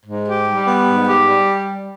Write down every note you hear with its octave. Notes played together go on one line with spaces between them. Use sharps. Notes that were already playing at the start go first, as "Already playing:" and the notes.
G#2
G4
G3
B3
G#2
G4
G3